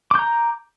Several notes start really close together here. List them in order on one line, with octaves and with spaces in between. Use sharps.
D6 G6 A#5